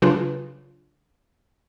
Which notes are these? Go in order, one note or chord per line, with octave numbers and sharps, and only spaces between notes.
C#3 F#3 D4 F4 G#4 B4